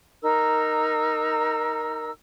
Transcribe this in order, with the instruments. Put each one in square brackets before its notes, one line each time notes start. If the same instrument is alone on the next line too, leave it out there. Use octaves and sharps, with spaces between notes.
[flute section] D#4 A#4 E6